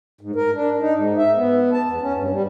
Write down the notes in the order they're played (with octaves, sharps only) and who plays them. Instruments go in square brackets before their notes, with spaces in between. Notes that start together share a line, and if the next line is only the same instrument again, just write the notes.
[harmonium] G#2
A#4
D4
D#4
G#2
E5
B3
A5
E2
C#4
G2
G3